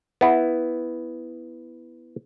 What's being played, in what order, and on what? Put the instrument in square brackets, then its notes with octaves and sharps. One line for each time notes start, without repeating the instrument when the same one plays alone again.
[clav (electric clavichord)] B3 E4